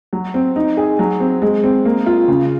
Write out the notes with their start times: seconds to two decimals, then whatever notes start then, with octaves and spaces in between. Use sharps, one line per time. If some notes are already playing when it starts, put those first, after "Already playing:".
0.13 F#3
0.34 C4
0.56 D#4
0.77 G#4
0.99 F#3
1.20 C4
1.42 G#3
1.64 C4
1.85 A#3
2.06 F4
2.28 C#3